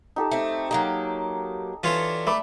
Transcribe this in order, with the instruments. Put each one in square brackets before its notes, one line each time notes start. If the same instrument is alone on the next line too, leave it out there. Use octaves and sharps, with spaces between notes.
[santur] D#4 G4 A4
[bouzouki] A3 C4
[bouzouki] F#3 A#3 G4 [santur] D#4
[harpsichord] E3 F4 C#5 [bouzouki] D4 A4
[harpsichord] A3 [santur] E5 B5 D6